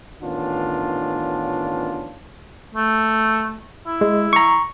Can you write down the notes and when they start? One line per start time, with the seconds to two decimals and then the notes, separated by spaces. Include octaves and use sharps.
0.22 A1 D#3 B3 C#4 D4 F4
2.75 A3
3.87 E4
4.01 G#3
4.33 A#5 C#6